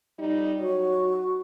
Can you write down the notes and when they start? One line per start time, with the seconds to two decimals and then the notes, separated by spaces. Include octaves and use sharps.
0.19 F2 G3 D#4
0.59 F#3 D#4 F#4 C#5